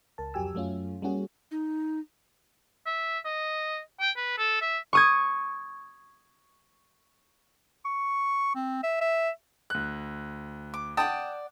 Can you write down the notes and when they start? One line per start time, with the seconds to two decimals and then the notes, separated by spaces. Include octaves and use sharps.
0.18 C#2 A#4 A5
0.34 F2 F#3 G4 G#5 E6
0.54 F#2 F#3 A3 C#4 F4
1.02 G3 A#3 C#4 F#4 G#4
1.51 D#4
2.86 E5
3.25 D#5
4.00 G5
4.17 B4
4.38 A4
4.61 E5
4.93 C#6 D#6 G#6
7.85 C#6
8.55 C4
8.83 E5
9.01 E5
9.70 D2 F#6
10.74 D6
10.97 D5 F#5 G5 A5 D#6